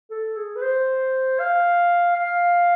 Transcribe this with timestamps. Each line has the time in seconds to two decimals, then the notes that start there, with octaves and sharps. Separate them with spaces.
0.11 A4
0.36 G#4
0.56 B4
0.62 C5
1.40 F5
2.16 F5